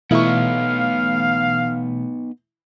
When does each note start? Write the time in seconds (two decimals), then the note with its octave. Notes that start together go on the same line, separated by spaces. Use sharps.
0.11 B2 E3 A3 B3 D#4 E4 F5 C#6